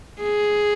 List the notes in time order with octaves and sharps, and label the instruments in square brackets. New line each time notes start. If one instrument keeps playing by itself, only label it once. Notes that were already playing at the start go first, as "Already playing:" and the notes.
[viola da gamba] G#4